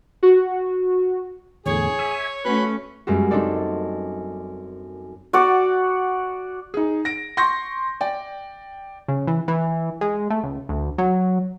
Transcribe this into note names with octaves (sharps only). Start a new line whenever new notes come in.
F#4
E2 A2 D3 G#4 C#5
E5 G#5
A3 C#4 F#4 B4 C6
F#2 G3 G#3 A#3 F#4
C4 D4 D#4 A4 D5
F#4 D5 F#5
D#4 G#4
A#6 D7
C6 C#6 G6 A#6
D5 G5
C#3
E3
E3
G#3
A3
C#2
D2
F#3